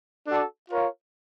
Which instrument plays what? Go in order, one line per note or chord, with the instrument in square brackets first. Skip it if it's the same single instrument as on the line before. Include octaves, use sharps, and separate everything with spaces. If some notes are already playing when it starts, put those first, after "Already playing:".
[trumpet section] D4 F#4 A4 D5
F4 A#4 C#5 F5